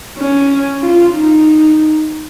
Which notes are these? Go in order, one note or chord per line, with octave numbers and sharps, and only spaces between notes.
C#4
F4
D#4